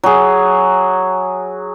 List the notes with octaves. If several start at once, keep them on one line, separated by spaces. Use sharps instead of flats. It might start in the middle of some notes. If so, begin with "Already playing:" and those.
F#3 G#4